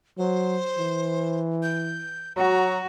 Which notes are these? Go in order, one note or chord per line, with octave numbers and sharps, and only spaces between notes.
F#3 C5
E3
G6
F#3 F#4 A#5